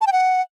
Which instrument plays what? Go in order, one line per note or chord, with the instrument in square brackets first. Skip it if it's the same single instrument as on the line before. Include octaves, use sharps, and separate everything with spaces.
[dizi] A5
G5
F#5